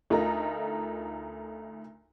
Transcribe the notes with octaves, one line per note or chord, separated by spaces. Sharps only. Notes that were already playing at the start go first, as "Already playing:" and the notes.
D2 A3 D#4 F4 A#4 A#5